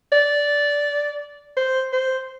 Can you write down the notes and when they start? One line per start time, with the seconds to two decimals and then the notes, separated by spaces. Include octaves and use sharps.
0.12 D5
1.57 C5
1.93 C5